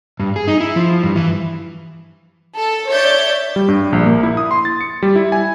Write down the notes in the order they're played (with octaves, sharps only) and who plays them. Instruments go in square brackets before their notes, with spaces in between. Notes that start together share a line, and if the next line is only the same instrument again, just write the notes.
[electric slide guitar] G2
G#4
D#4
E4
F3
G2
E3
[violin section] A4 A5
C#5 D5 E5 G6 A6
[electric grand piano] G3
G2
A#1
A#3
E4
D#6
C6
A6
C#7
G3
E4
G#5